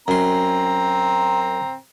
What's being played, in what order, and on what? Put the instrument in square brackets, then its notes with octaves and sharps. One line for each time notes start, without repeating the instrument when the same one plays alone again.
[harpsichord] F#2 C6 [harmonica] C4 A#5